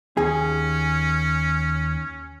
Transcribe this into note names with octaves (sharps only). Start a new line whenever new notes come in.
D#2 C#4 G#4